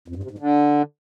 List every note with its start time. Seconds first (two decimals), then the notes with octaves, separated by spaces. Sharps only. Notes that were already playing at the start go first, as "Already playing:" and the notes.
0.08 F2
0.16 G2
0.23 C3
0.31 G#2
0.39 D3